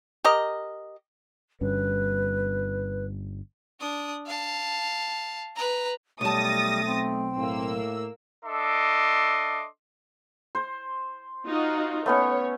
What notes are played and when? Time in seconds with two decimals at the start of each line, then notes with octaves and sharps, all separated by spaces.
0.24 G4 A#4 D#5
1.61 G1 G2 C#4 B4
3.80 D4 D#6
4.27 F5 A5
5.56 B4 A#5
6.21 B1 G3 A3 A5 D#6 A6 A#6
6.85 C4
7.37 A2 A#3 E6
8.45 D4 A4 D#5 E5 C6 D6
10.55 C5
11.46 D#4 F4 F#4
12.06 A3 B3 C#4 C#5